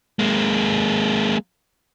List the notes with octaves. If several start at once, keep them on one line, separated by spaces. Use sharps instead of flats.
G#3 A#3